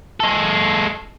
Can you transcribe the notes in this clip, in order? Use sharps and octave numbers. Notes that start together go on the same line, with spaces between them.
G#3 A4